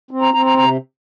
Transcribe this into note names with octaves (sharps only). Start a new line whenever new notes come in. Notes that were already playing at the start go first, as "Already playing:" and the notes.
C4
A#5
C4 A#5
A#5
C3 A#5